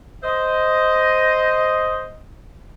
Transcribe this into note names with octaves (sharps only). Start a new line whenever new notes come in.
C5 D#5